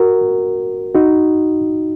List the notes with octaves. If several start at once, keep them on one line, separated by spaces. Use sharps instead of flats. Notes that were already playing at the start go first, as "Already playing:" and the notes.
Already playing: F#4 A#4
D#4 F#4